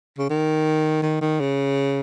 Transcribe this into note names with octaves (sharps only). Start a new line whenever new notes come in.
C#3
D#3
D#3
D#3
C#3